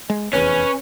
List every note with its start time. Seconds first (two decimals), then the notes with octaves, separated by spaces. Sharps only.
0.10 G#3
0.33 F1 E2 C#4 B4